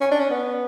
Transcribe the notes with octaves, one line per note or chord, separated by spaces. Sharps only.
C#4
D4
C#4
B3